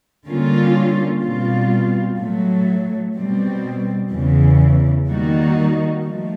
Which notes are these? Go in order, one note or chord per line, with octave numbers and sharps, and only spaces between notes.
D3 G3 A#3 C#4 F4
B2 G3 C4 F4
A2 F#3 A3
B2 G3 C4
E2 C#3 E3
D#3 G3 A#3 D#4 F#4
F3 A3